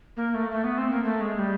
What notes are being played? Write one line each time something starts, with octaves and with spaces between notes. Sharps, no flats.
A#3
A3
A3
B3
C4
A#3
A3
G#3
G3